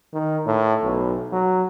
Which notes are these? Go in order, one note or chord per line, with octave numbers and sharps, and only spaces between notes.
D#3
A2
B1
F#3